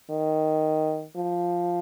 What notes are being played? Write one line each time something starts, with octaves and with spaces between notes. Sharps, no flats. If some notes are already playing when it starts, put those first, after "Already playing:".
D#3
F3